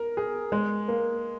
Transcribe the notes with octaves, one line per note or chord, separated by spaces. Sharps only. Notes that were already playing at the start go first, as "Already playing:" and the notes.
Already playing: A#4
G#4
G#3
A#3